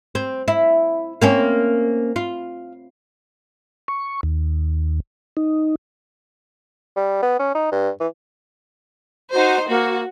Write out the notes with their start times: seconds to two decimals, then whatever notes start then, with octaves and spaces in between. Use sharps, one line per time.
0.15 C4
0.48 E4
1.22 A#3 C4 C#4
2.16 F4
3.88 C#6
4.23 D#2
5.37 D#4
6.96 G3
7.23 B3
7.39 C#4
7.55 D#4
7.72 G2
8.00 E3
9.33 D#4 F#4 C5
9.69 A#3 F#4